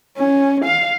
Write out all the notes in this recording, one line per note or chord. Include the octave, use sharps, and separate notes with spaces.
C#4
F5